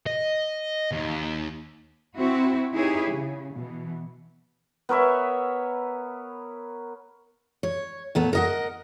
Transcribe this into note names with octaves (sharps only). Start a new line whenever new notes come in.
D#5
D#2
C4 E4 F#4
D#4 E4 G4 G#4 B4 C#5
C#3
B2 E3
B3 A#4 C#5 E5
C#5
A#2 A3 B3
A#4 D#5 F#5